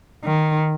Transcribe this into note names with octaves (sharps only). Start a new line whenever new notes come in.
D#3